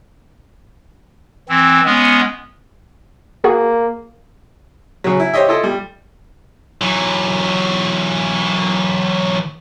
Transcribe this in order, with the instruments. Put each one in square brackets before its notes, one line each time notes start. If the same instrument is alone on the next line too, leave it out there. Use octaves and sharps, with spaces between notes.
[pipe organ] E3 C4
G#3 B3 C#4
[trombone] A#3 [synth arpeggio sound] F#4 G#4
[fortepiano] C#3 F#3
E4
G4 C5 C#5 D#5 E5
E4 F4 A4 D#5
G3
[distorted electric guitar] E3 F#3